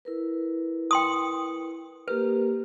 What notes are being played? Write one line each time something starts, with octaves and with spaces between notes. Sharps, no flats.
E4 A#4 B4
G5 C6 D#6
A#3 G4 A#4 B4